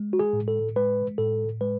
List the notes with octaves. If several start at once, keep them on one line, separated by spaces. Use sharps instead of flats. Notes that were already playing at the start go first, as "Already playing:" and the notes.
Already playing: G#3
F#4
G#4
A2
A4
G#3 B4
A2 A4
G#3 B4